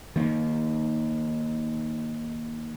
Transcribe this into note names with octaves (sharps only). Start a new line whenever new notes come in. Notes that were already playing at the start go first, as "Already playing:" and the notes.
D#3 A#3